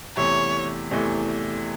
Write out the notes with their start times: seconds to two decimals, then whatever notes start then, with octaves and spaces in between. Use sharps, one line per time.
0.17 E2 C3 E3 A3 C#5
0.91 E2 C3 E3 A3